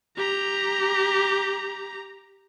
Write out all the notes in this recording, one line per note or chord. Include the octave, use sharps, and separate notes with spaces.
G4 A#5